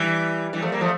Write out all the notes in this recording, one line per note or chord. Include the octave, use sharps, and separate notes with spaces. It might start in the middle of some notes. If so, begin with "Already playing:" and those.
Already playing: E3 G3
E3 G3
F3 A3
G3 A#3
F3 A3